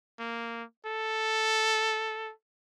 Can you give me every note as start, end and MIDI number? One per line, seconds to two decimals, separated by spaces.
0.19 0.63 58
0.86 2.32 69